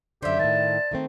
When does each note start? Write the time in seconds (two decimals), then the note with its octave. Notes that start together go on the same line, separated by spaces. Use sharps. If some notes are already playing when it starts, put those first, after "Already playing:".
0.22 F#2 D3 G4 C5 D5 E5
0.39 A2 D#3 A5
0.91 D#3 A3 C4